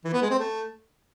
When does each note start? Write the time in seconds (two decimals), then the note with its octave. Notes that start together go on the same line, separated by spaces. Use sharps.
0.05 E3
0.13 B3
0.22 G#3
0.31 C4
0.39 A3